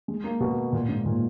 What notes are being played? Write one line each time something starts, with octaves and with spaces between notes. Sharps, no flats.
G#3
A#3
B2
A#2
G#2
A#2